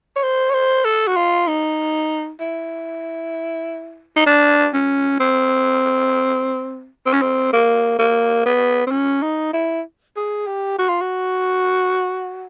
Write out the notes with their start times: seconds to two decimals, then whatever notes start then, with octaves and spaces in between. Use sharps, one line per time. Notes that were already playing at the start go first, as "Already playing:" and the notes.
0.16 C#5
0.23 C5
0.50 C#5
0.54 C5
0.85 A4
1.07 F#4
1.16 F4
1.47 D#4
2.40 E4
4.16 D#4
4.26 D4
4.74 C#4
5.20 C4
7.06 C4
7.13 C#4
7.22 C4
7.53 A#3
7.99 A#3
8.46 B3
8.87 C4
8.91 C#4
9.22 D#4
9.53 E4
10.16 G#4
10.47 G4
10.78 F#4
10.89 F4
11.01 F#4